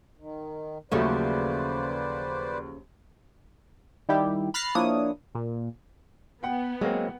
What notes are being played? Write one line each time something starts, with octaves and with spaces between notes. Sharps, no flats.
D#3
D#2 C#3 F3 F#3 A3 B4 C5 D5
D#3 G3 E4 G4
B5 F6 F#6 A6 A#6 C7
F3 A#3 D4 E4 C#5 D#6
A#2
B3 F#5 G5
F#3 G#3 A#3 C4